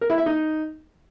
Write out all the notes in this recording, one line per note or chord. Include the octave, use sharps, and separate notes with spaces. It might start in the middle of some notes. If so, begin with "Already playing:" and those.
A#4
E4
E5
D#4